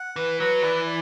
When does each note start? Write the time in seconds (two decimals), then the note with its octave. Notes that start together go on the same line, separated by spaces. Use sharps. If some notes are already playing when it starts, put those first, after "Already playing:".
Already playing: F#5
0.16 E3 B4
0.40 F#3 B4
0.63 E3 D5
0.86 D5